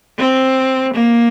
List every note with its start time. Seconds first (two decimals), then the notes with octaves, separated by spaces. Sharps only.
0.18 C4
0.94 A#3